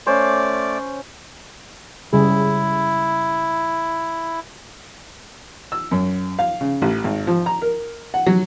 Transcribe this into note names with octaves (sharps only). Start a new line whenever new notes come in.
A3 C#4 C5 D5 D6
C#3 G3 E4 G#4
E6
F#2
F5
C#3
A1
G#1
F3
A#5
A#4
F#5
F#3